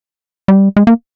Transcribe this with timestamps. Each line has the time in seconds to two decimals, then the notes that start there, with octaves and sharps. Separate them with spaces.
0.48 G3
0.77 G#3
0.87 A#3